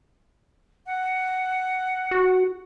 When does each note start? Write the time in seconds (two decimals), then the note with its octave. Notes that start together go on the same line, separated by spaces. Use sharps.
0.86 F#5
2.11 F#4